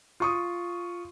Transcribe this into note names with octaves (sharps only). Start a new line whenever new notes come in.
F4 C#6 D#6